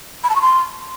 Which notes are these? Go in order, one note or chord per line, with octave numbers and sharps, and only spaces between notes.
B5
A5
C#6
C6